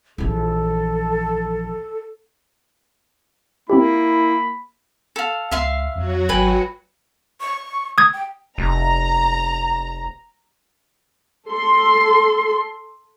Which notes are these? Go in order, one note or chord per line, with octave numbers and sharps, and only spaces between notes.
A#1 E3 A4
A#3 C4 E4 F4 G4 B5
A4 F5
C#2 E5 F5 C6
F2 F#3 F#4
G#1 B4 G5 G#5
C#6
D#6 G#6
G5
F1 A#5
A4 C6